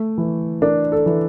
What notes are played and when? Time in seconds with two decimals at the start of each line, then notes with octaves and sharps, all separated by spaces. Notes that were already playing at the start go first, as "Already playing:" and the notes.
Already playing: A3
0.18 E3
0.62 D4 A#4
0.92 A4
1.06 E3